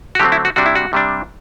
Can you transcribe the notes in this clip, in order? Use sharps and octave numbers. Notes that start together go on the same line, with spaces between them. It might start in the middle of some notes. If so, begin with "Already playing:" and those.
F#4
D3 F#3 A3 C4 G4
E4
F#4
C3 G3 D4 F#4
E4
F#4
C3 G3 D4